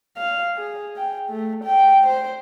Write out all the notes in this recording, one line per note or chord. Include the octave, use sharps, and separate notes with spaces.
F5
G#4
G5
A3
G5
C5